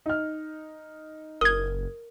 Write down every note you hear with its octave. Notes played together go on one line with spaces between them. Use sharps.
D#4 F6
F#1 A#4 D#6 G#6